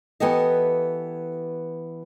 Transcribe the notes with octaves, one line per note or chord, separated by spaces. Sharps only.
E3 B3 G4 A4 D#5